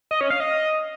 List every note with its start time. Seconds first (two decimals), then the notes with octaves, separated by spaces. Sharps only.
0.11 D#5
0.21 C#4
0.30 F5
0.40 D#5